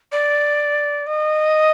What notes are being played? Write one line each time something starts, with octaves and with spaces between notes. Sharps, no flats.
D5
D#5